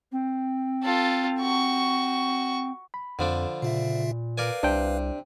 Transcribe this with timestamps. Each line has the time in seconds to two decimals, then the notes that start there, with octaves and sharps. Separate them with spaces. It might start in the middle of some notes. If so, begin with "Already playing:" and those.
0.11 C4
0.83 F4 A4
1.39 F#4 C#6
2.94 B5
3.19 F2 D3 F3 D4
3.62 A#2 C#3 F4 E5
4.38 A#4 B4 D5 F5 G#5
4.63 C2 C3 D4 D5 G5